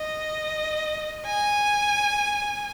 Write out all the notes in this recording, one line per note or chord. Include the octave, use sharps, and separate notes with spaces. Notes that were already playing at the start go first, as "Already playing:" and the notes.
Already playing: D#5
G#5